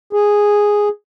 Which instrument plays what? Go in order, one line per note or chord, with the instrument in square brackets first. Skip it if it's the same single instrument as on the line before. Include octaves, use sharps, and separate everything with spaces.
[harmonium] G#4